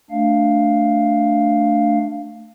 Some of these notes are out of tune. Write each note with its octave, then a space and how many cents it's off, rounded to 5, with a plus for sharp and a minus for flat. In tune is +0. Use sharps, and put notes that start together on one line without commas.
A3 +10 D4 +0 F5 +0